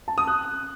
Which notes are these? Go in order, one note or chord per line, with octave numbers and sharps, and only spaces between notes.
A5
D#6
F#6